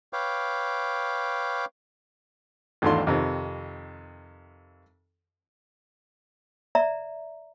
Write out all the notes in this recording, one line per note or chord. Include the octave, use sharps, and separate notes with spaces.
B4 C#5 F5 G5 D6
G#1 E2 A3 D4 F4 C6
F2 C3 D#3
D5 E5 A#5